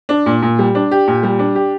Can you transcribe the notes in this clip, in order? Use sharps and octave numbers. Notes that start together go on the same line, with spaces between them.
D4
A#2
A#2
G3
D4
G4
A#2
G3
D4
G4